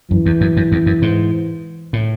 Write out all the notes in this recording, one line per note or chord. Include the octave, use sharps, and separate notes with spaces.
F#2 E3
E2
F#2
F#2
E2
F#2
G#2
A2